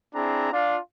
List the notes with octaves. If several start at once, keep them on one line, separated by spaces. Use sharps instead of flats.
C4 D4 E4 G#4 A#5
D4 F4